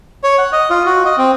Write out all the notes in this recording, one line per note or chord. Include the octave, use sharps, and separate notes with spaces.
C#5
F#5
D#5
F4
F#4
D#5
C4